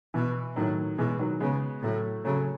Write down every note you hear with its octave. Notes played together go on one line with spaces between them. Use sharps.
B2 E3
A2 D#3 F#3
B2 E3 G#3
D#3 F#3
C#3 G#3 B3
A2 F#3 A3
C#3 F#3 A3